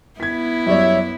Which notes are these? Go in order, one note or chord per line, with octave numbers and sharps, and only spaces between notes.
B3 E4 G#6 B6
F#2 G3 C#5 D5 E5